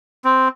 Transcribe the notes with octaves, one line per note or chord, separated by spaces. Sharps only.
C4